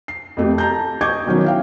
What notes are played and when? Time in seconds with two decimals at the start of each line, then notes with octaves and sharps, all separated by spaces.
0.08 C7
0.37 F2 A3 G4
0.58 A5 A#5 G6
1.01 D#5 C#6 D6 G6 G#6
1.26 B2 D#3 F#3 C#4
1.44 E4 F5 G5